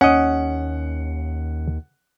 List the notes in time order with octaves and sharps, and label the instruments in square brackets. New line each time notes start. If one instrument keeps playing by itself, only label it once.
[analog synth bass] D#2 [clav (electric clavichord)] C#4 D#5 [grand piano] F#5